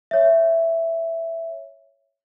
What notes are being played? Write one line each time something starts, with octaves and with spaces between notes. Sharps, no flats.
C#5 E5